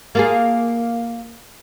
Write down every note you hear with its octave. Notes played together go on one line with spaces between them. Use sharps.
A#3 F4 G#4